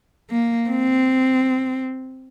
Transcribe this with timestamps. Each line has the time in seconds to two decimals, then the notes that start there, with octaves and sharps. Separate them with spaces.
0.31 A#3
0.70 C4